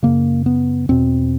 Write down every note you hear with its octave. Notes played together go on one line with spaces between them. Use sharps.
F#2 C#3 A#3
B3
E2 B2 C4